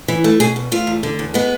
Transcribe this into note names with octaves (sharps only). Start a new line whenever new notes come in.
E3
A3
B2 G#4
E2
A3 F4
E2
D3
E2
G#3 B3